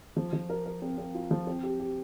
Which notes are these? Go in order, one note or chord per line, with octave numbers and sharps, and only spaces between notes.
F3
F3
A#4
A#4
C4
C4
F4
F3
C4
G4
G4